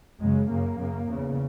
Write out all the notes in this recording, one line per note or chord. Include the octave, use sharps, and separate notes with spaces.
F#2 C#3 G#3
F#2 C#3 A#3
F#2 C#3
E2 C#3